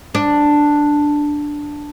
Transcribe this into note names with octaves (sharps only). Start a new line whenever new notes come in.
D4